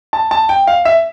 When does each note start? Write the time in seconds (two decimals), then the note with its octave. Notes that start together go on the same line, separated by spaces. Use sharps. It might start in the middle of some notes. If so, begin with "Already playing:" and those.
0.13 A5
0.31 A5
0.49 G5
0.67 F5
0.85 E5